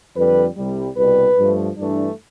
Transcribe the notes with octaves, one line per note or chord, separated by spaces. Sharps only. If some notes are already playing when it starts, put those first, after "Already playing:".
F2 D3 G3 B4
C2 C3 G3
C2 B2 G3 B4
G2 F3 A3
G2 E3 A3 D4